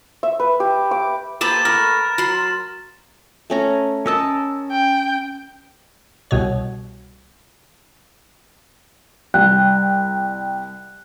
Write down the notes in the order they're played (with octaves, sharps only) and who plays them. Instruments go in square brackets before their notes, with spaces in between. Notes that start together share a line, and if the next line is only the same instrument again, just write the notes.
[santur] E5
B4
G4
D6
[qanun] A#3 C5 A#5 [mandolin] G4 A4 B4 [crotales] A6 E7
[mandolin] A3 [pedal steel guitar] A#4 [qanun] B4 G#5 B5
[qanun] F#3 [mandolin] B5 C6
[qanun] A3 C#4 A#5
[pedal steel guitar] C#4 E6 [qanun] A#4 D#5 A5
[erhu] G5
[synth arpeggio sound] C2 B2 C#5
[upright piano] C2 [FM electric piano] G5 [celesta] F#6